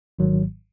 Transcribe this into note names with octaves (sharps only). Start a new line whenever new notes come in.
G#1 G#2 D#3 F#3